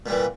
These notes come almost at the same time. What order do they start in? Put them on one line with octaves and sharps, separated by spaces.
A#2 G3 E3